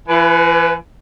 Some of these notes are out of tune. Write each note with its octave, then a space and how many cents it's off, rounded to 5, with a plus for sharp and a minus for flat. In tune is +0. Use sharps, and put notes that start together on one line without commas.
E3 +40 B4 +0